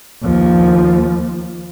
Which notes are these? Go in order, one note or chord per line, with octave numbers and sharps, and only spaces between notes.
D#2 F3